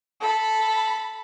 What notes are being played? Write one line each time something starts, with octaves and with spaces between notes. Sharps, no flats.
A4 B5